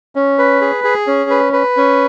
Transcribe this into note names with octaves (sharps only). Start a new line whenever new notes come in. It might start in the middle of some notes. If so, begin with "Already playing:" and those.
C#4
B4
G#4
G#4
C#4
B4
B4
C#4